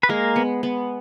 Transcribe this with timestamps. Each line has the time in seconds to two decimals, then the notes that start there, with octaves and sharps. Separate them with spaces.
0.03 B4
0.09 G#3 A#3 A#4
0.36 B3
0.63 B3